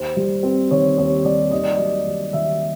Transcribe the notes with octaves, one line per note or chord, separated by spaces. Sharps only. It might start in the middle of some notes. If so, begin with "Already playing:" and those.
Already playing: D#2 C5
G3
C4
D#3 C#5
D#2 C#5
G3 D5
D#2 D#5
D5
F#3 D#5
D#2
D#3 E5